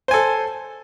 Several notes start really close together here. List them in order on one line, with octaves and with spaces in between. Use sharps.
C5 G#5 A4